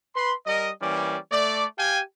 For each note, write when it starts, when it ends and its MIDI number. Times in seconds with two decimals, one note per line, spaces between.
0.15 0.34 71
0.15 0.34 83
0.15 0.34 84
0.46 0.70 55
0.46 0.70 70
0.46 0.70 75
0.82 1.17 52
0.82 1.17 55
0.82 1.17 58
0.82 1.17 61
0.82 1.17 74
1.32 1.66 57
1.32 1.66 74
1.79 2.01 67
1.79 2.01 77
1.79 2.01 79
1.79 2.01 80